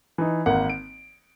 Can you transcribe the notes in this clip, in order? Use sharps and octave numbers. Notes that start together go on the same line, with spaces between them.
E3 D#4
G#1 A#3 F#5
D7